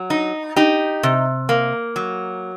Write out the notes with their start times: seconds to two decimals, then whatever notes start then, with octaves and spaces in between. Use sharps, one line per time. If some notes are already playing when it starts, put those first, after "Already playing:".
Already playing: F#3
0.10 D#4
0.56 D#4 G4
1.03 C3
1.49 A#3
1.96 F#3